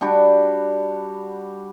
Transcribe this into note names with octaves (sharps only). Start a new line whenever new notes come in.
G3 D4 F#4 G4